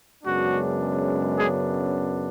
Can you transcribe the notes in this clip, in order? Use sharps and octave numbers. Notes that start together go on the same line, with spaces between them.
F#2 C#3 G#3 B3 D4 F#4
G#3 G#4